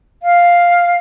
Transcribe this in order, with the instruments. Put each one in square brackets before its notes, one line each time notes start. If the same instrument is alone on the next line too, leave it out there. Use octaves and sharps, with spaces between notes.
[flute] F5